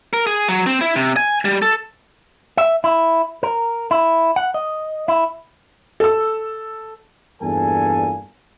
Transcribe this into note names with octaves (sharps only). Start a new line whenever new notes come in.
A#4
G#4
F#3
C4
E4
C3
G#5
G3
A4
E5
E4
A#4
E4
F#5
D#5
E4
A4 E6
E2 G2 A#2 A4 G#5